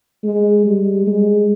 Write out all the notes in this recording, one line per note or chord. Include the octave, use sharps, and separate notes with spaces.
G#3
G3
G#3